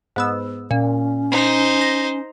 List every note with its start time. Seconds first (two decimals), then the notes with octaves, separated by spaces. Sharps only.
0.16 G#2 B3 E6
0.71 A#2 C#4
1.32 D#4 C5
1.81 A#6